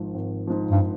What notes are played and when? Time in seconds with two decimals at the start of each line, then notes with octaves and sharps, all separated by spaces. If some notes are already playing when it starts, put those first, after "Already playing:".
Already playing: G#1 G#2 F3
0.14 G#1
0.47 G#2 F3
0.71 G2